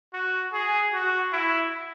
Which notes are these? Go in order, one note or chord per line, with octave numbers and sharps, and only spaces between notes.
F#4
G#4
F#4
E4